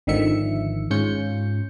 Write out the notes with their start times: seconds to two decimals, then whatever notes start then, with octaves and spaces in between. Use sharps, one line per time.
0.07 G#1 D3 D#3 F3 E5 C#7
0.91 G#2 C#4 F4 G6 C#7